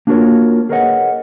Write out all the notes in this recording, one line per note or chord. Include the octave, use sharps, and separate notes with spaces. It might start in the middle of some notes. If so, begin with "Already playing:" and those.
A#3 D4 F4 F#4 A#4 C#5
G#4 A#4 B4 C#5 D#5 F#5